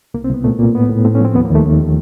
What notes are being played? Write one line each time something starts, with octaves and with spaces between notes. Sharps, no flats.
C2 A#3
C4
C2 B3
A#2 A3
A#2 A#3
A2 B3
A2
A2 C4
C#4
F3 C4
D#2 B3
A#3
D#2
A3
D#2
D#3